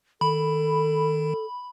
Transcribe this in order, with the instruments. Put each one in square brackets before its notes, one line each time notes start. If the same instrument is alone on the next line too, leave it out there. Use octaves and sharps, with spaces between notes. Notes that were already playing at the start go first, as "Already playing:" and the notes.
[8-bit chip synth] D#3 [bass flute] A4 [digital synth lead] B5